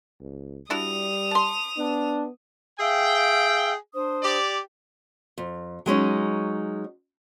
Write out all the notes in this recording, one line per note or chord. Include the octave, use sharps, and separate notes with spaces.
C#2
G3 D4 E4 F#4 D#6 F7
A5 C6
B3 D4
G#4 E5 F5 G5 E6
D4 C5 D#6
G4 D5
F2
F#3 G#3 C#4 D#4